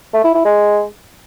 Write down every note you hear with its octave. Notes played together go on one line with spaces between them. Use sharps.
A3
E4
E4
G#3